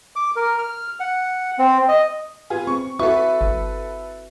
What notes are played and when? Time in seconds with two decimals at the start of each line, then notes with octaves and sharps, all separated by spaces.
0.16 D6
0.36 A#4
0.59 F6
1.00 F#5
1.59 C4
1.88 D#5
2.50 B3 F4 G#4
2.67 C4 C#6
2.99 E4 F#4 A4 B4 E5 C#6
3.41 G1